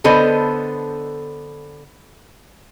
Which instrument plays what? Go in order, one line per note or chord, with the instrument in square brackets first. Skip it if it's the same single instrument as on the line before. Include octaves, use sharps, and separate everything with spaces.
[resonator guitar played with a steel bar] D3 B3 A4 C5 D#5